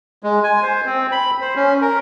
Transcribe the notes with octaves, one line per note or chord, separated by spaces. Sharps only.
G#3
G#5
C5
C4
B5
C5
C#4
A#4